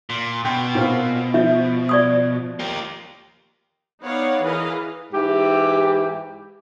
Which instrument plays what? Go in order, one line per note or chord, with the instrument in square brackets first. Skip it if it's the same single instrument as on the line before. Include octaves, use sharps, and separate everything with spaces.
[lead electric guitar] A#2
[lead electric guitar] B2 [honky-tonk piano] G5 C6
[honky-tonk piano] A#2 C4 F4
[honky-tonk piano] F3 G6 [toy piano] E5
[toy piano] D5 C#6 D#6
[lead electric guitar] A#3 G4
[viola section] B3 D#4 C#5 D5 F5 F#5
E3 G#4 A#4 B4 D#5 F5
[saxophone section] G#2 E3 G4